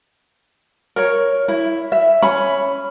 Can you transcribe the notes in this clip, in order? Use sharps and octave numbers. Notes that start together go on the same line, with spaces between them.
A#4 C#5
E4
E5
C#4 B5